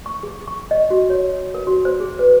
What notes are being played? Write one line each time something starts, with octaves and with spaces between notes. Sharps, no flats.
C#6
G#4
C#6
D#5
F#4
C#5
A#4
F#4
C5
G#4
B4